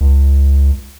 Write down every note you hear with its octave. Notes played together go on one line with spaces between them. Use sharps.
C#2